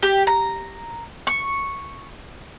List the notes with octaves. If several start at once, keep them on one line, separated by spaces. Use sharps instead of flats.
G4
A#5
C#6